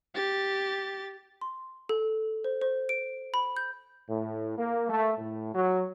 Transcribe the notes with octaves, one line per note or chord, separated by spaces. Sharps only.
G4 A6
C6
A4
C5
C5
D7
B5
G6
A2
A#3
A3
A2
F#3